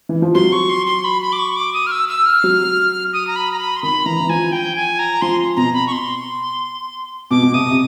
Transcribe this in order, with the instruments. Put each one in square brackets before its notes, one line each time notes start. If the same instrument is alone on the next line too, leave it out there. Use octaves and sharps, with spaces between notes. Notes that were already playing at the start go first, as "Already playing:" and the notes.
[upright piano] E3
F3
[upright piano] F#3 [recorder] C6
[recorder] C#6
C6
C6
B5
B5
D6
C#6
D6
D#6
F6
E6
E6
F6
[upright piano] F#3
[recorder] D#6
A#5
B5
A#5
B5
C6
[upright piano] D#3 [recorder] B5
[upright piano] E3 [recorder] A#5
[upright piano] E3
[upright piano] F3 [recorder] G#5
[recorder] G5
G#5
A#5
[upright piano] F3 [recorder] C6
[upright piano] B2 [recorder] A#5
[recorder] B5
C#6
C6
[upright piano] B2 [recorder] D6
[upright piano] B2
[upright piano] C3 [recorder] D#6
[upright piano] C3